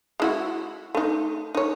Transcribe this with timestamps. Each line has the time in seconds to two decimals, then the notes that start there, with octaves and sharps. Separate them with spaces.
0.20 G#3 E4 F#4
0.95 A3 D#4
1.55 D#4 C#5